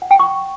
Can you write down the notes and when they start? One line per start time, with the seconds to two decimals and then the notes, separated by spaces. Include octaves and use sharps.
0.02 F#5
0.11 G5
0.19 C#6